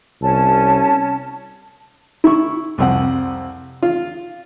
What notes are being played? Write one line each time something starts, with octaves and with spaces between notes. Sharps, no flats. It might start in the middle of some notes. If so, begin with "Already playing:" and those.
C2 C#4 A5
E4 C#6
C2 F2 C4 F#5
F4